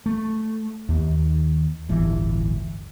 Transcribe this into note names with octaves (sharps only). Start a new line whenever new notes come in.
A3
D#2
D1 G1 E3